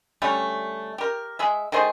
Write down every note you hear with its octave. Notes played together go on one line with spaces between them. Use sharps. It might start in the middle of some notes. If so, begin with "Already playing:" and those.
D3 G3 A3 C#4
G4 A#4
G#3 G#4 E5
D#3 A3 G#4 C5